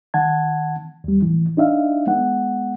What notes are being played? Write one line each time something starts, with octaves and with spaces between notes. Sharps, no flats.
D#3 F#5 A5 G#6
D#2 G3
A2 E3
D4 D#4 E5 F5
G#3 B3 F#5